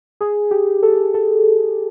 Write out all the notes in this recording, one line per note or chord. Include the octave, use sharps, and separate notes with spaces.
G#4
G4
A4
A4